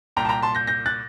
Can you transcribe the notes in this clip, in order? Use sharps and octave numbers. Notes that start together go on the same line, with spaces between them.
C2 A#2 G5 A#5
A5
G5 A#5
A5 C6
G6 A#6
G6 A#6
F#6 A6